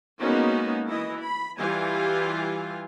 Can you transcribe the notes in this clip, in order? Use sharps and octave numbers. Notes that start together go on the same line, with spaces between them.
G#3 A#3 B3 C#4 D#4 F#4
E3 E4 D#5
B5
E3 G3 F4 G4 G#5